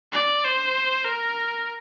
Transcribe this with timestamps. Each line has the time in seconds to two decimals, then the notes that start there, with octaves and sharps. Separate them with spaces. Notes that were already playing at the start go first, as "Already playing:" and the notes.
0.13 D5
0.44 C5
1.05 A#4